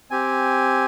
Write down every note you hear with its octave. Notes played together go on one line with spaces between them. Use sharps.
C4 G4 G#5